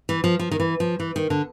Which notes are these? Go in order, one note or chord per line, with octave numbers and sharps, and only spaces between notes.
E3
F3
F3
D#3
E3
F3
E3
D#3
D3